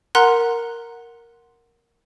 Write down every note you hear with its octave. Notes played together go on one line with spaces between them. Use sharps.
A#4 F#5 A#5 C6 F#6